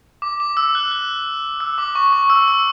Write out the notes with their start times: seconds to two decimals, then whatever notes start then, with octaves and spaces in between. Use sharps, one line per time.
0.22 D6
0.40 D6
0.57 E6
0.75 F#6
0.92 F#6
1.60 E6
1.78 D6
1.95 C#6
2.13 C#6
2.30 E6
2.48 E6